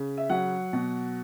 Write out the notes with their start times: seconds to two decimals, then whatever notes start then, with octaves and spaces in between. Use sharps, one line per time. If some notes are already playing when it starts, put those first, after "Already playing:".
Already playing: C#3
0.17 E5
0.30 F#3 F#5
0.73 B2